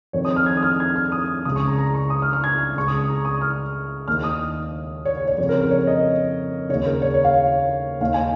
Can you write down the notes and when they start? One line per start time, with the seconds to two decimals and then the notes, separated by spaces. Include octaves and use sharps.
0.13 F2 D#3 C#5
0.25 D#6
0.36 F6
0.46 G#6
0.57 D#6
0.63 F6
0.80 G#6
0.96 F6
1.12 D#6
1.45 C#2 D#6
1.49 C#3
1.56 C#6
1.68 A#5
1.78 A#5
1.95 C#6
2.10 D#6
2.22 F6
2.33 F6
2.44 G#6
2.76 C#2 C#3 C#6
2.88 D#6
2.98 D#6
3.09 A#5
3.25 D#6
3.41 F6
4.08 D#2 D#3 F6
4.24 D#6
5.05 C#5
5.17 C#5
5.28 C#5
5.38 F2 C#3 C#5
5.49 A#4
5.61 A#4
5.71 C#5
5.87 D#5
6.69 C#3 C#5
6.74 D#2
6.86 A#4
7.02 C#5
7.14 C#5
7.25 F5
8.01 D#2 D#3 F5
8.14 G#5